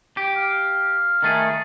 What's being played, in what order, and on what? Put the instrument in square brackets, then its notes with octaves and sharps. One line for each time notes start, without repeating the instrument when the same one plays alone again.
[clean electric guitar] G4
[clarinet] F5
[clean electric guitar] D#3 A3 G#4